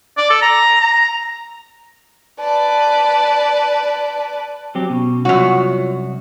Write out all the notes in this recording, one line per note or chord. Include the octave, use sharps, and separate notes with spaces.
D5
A4
A#5
A#5
B4 D5 A5
F#3 C4 G4
B2 B3 C#4 C#6
C2 F#2 F4 F#4 C#5